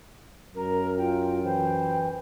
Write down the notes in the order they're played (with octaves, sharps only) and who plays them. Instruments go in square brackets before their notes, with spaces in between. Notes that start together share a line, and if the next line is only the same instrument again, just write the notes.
[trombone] F#2 [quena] A#4
[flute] F4 [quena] G5
[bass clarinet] E3 [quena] C5 [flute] G5